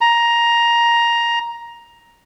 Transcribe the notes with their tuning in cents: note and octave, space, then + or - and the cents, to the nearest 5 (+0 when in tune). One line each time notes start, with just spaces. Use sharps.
A#5 +10